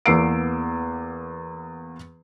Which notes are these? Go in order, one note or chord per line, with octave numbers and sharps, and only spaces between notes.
E2 A#3 B3 E6 C7 D7